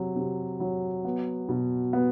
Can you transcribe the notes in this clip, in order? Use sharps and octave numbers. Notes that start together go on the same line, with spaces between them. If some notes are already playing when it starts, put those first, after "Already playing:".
Already playing: C3 F#3
C3
F#3
B3
B2
B3